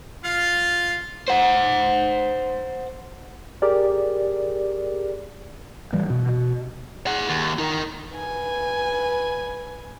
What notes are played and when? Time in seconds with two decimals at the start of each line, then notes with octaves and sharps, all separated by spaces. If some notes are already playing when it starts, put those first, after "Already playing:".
0.24 F4 F5
1.28 C5 F#5
3.62 G4 G#4 A#4 D5
5.93 A1 E3 G3
6.10 B2
7.07 G#4 F#5
7.29 D#2
7.59 D#4 A#4
8.13 B4 G#5